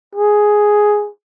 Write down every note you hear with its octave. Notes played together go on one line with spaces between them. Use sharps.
G#4